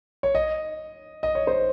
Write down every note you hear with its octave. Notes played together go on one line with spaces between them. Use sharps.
C#5
D#5
D#5
C#5
C5